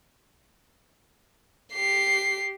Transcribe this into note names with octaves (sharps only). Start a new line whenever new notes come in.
G4 C7